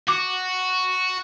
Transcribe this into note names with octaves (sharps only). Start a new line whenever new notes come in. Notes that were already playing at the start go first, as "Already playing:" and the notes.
F#4 D6